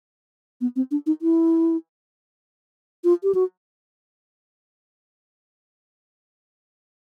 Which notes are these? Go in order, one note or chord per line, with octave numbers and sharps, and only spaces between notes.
B3
C4
D4
D#4
E4
F4
G4
F#4